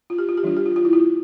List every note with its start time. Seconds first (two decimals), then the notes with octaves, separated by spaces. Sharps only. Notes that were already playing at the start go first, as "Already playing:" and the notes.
0.10 F4
0.18 G4
0.29 F4
0.37 G4
0.43 E3 G3 D4 F4
0.57 G4
0.66 F4
0.76 F4
0.85 E4
0.93 F4